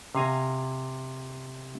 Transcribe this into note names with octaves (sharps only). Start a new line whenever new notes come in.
C3 F5 G#5 A#5